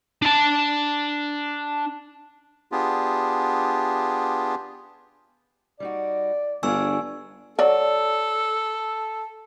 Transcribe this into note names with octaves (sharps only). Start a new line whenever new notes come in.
D4 A5
B3 D4 F4 G4 G#4
G3 D#4 F#4 D5
G1 D4 F4 G#4 G#5 C#6 E6
F#3 A4 D5